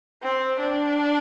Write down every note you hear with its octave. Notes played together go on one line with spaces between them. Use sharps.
C4
D4